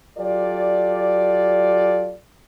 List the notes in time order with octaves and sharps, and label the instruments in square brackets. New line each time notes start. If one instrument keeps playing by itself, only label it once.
[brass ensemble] F#3 F4 G4 A4 D5